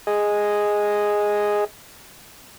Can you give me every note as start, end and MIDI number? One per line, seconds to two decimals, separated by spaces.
0.07 1.64 68
0.07 1.64 75